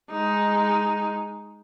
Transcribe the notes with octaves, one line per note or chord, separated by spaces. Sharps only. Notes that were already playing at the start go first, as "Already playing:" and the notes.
G#3 D#4